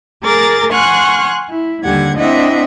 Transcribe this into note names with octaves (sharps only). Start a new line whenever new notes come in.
G#4 A#4 A#5 D6 A6
F#5 G#5 C6 C#6 F6 F#6
E4
D#2 D3 G3 G4 F#5 G#6
C4 D4 E4 D#5 E5 F#5